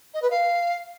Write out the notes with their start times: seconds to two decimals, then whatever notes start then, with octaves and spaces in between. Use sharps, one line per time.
0.14 D#5
0.22 B4
0.30 F5